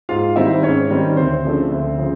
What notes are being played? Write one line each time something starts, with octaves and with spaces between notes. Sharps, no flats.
G#2 F4 F5
D#3 G3 C4 D#4 E4 E5
G#2 C#4 C#5
D#3 G3 C4 D#4
D2 C4 C5
C#3 F3 A3 D4
D2
C#3 F3